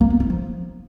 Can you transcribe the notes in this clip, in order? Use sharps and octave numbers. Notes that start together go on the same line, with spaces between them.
A#3
B3
E4
F3